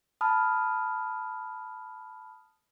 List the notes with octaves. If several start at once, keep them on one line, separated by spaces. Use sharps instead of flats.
A5 B5 D#6 F6